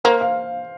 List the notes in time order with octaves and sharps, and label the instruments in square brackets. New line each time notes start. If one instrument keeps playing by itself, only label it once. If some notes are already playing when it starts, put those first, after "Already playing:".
[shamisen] A#3 [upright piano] C5
[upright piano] F5